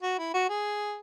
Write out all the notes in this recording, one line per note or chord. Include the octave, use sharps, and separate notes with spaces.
F#4
E4
F#4
G#4